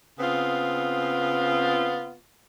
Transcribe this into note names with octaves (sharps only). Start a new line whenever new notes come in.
C#3 B3 C4 F4